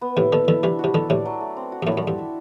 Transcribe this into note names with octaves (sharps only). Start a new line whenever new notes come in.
B3
A2 C3 E4
B2 D3 A4
B2 D3 E5
C3 E3 D4
F#4
C3
B2 D3 A4
A2 C3 D5
F#3
A3
C4
F#4
G2
F#2 A2 E4
F#2 A4
G2
E5